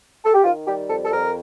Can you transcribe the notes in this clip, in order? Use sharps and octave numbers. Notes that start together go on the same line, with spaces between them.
A4
G4
D#3 F4
G3 G4
F2 A4
A4
F2 A#4